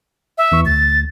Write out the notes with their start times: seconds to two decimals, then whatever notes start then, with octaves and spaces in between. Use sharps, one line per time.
0.38 E5
0.52 E2 E3 C#6
0.65 D2 A6